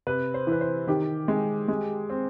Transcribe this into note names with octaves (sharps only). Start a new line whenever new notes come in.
C3 B4
C5
E3 B4
C5
D#3 G4
G#3
G#3
C4